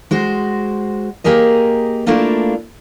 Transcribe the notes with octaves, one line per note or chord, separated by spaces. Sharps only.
G#3 F#4 C5
A#3 G4 G#4 A#4 D#5
A3 A#3 D4 E4 F4 A4